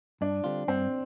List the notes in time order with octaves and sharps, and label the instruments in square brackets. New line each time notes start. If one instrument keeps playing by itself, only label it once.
[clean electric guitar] G2 [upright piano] D4
[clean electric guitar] D3 G3 C4 F4
[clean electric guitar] G2 [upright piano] C4